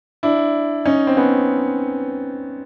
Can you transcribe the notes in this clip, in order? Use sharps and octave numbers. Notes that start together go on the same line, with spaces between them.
D4 E4
C#4 D#4
C4
B3 C#4